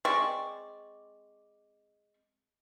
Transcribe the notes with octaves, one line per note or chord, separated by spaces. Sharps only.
G#3 C4 D5 C#6